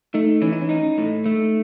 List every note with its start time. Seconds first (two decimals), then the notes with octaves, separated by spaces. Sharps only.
0.14 A3 D#4
0.42 E3 C#4
0.52 D#4
0.61 C#4
0.69 D#4
0.98 A2
1.26 A3